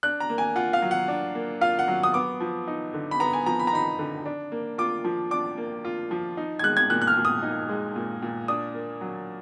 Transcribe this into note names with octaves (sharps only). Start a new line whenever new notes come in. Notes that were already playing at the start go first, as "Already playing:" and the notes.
D4 F#6
A#5
A#3
G#5
F4 F#5
F5
F#3
F#5
D4
A#3
F4 F5
F#5
F#3
D#6
B3 D6
F3
D#4
D3
B5
B3 A#5
G#5
F3 A#5
B5
A#5
D#4 B5
D3
D4
A#3
F4 D6
F3
D4 D6
A#3
F4
F3
D#4
G#6
G#3 F#6
G#6
A#2 F#6
F#6
F6
A#2
D#6
D#4
G#3
A#2
A#2
D4 D#6
A#3
F#3